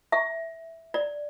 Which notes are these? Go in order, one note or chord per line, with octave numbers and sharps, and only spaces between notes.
E5
D5